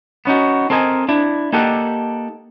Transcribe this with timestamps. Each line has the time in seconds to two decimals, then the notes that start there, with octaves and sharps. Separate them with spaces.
0.25 B3 C#4 D#4 F#4
0.70 C4 A4 A#4 D#5 G#5
1.09 D4 E4
1.53 A#3 D#4 G4 A4 D5 F#5